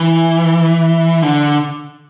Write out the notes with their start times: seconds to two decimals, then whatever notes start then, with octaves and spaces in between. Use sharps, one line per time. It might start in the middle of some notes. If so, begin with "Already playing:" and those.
Already playing: E3
1.22 D3